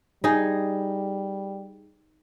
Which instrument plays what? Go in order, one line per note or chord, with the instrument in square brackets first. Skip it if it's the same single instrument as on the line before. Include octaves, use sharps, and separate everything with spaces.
[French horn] G3 [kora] D#4 G#4